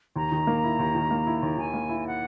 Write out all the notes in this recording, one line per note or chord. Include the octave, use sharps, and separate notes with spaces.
D#2 A#5
D#3
A#3
E4
D#2
D#3
A#3
E4
D#2
D#3 G#5
A#3
E4
F#5